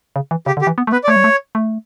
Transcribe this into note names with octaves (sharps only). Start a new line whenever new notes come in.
C#3
E3
C#3 G4
D3
G4
E3
B3
A3
B3 B4
D5
A3 C#5
G3
A3
A3